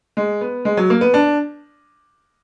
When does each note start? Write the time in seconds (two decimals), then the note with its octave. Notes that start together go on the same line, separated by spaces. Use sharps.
0.17 G#3
0.41 B3
0.65 G#3
0.77 F#3
0.90 A#3
1.01 B3
1.14 D4